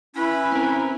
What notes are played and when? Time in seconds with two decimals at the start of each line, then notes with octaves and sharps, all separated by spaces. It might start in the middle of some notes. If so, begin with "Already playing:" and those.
0.16 C#4 E4 B4
0.52 C4 A#4